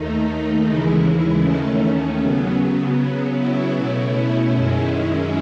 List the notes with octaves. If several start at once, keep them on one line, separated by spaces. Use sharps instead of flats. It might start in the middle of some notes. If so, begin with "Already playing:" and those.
Already playing: D#2 D#3 A3 D#4
D#2 C#3 E3 G#3 E4
D#2 D#3 A3 C#4
C#3 F#3 B3
C#3 F#3 B3
E4
B2 A3 C#4
F#2 D#3 G#3 C#4